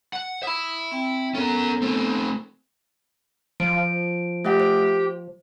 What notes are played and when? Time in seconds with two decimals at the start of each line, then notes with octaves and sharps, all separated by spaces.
0.13 F#5
0.43 E5 B5 D#6
0.91 C4 G5
1.34 B3 C#4 A4 A#4
1.82 A3 C4
3.60 F3 D7
4.45 A3 G4 E5 F#5
4.60 C5